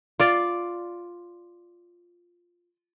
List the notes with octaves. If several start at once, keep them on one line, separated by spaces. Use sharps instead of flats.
F4 D5 F5